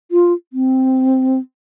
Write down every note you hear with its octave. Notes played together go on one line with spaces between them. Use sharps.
F4
C4